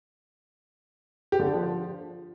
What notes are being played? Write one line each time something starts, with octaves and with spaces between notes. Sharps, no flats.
G4
D3
D4
F3